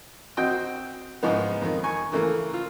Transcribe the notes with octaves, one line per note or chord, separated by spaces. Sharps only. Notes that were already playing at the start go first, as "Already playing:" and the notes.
C4 F#4 D#5 G5
G#2 C#3 F3 G#3 B3
F2 D#3
G#5 C#6
C#3 E3 A3 A#3
F4